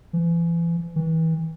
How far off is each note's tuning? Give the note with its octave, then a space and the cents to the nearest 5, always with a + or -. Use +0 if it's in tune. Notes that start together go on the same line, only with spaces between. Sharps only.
E3 +35
E3 -30